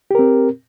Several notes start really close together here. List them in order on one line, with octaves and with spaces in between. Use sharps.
G4 A#4 C4